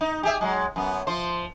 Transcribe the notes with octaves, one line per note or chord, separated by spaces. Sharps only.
D#4
G4 G#4 E5
F#3 G#3
F#2 B3
F3 C5